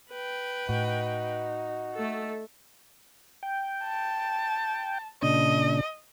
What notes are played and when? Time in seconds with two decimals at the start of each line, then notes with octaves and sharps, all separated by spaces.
0.12 B4 G5
0.69 A2 D#4 F#4
1.94 A3 A4
3.43 G5
3.83 A5
5.23 A#2 C#3 D4 D#5